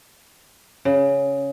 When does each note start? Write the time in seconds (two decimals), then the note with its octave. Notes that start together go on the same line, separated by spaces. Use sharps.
0.85 C#3